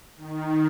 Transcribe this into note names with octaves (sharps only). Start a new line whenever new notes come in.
D#3